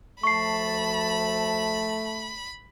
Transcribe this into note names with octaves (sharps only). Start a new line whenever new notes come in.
D2 F3 A3 A5 B5 C#6 C7